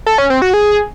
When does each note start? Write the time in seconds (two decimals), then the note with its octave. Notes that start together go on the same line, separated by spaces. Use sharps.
0.06 A4
0.18 C#4
0.30 C4
0.42 F#4
0.54 G#4